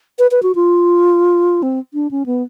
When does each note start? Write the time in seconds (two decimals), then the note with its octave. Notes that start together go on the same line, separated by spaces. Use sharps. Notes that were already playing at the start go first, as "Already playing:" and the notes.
0.19 B4
0.31 B4
0.43 F#4
0.55 F4
1.63 C4
1.94 D4
2.11 C#4
2.26 B3